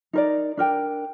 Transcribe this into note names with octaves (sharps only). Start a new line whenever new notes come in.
D#4 A#4 D5
D4 A#4 G5